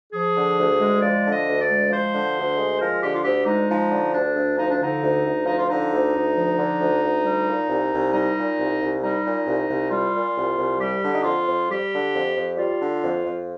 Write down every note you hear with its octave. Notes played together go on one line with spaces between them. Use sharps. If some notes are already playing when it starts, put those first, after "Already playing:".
F3 G#4
D3
D2
G#3
F3 D5
D3
D#5
D2
D5
G#3
F3 C5
D3
D2
G#3
F3 A#4
D3 G4
F4
D2 G4
G#3 D#4
F3 D#4
D3
D2 D4
D2
F3 D#4
D4
D3 D#4
D2
D2
F3 D#4
F4
D3 D#4
D2
D2
F3
D3
D2
D2
G3
A#2
C2
C2
G3 D#4
A#2
C2
C2
G3 D#4
A#2
C2
C2
G3 F4
A#2
C2
C2
G3 G4
D3
D#4
F2 F4
F2
G3 G4
D3
F2
F2
G3 F4
D3
F2
F2